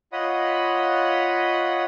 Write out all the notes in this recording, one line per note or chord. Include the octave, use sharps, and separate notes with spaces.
F4 C#5 D#5 F#5 B5 D#6